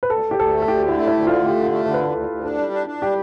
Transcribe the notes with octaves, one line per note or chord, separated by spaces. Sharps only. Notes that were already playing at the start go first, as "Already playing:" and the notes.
B4
D2 A4
D2
G4
D2 A4
A3
A4
D2 G4
D3 E4
A3
E4
D2
D3 F4
A3 G4
D3
G4
A3
D3 A4
B4
D2 A4
D2
D2
D4 A4
G3
D4
D4
G3 G4